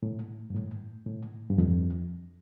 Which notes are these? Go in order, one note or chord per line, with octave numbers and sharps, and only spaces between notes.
A2
G2
A2
A2
G2
F2